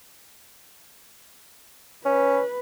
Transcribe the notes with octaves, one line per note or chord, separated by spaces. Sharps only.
C#4 B4